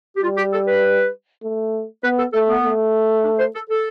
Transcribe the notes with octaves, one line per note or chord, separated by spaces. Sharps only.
G4
G3 F4
G4
A4
B4
A3
B3 B4
A4
A3 A4
B3
A3
D4
C5
A4
A4